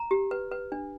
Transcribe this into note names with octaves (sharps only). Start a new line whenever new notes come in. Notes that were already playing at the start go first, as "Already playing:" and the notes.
Already playing: A#5
G4
B4
B4
D4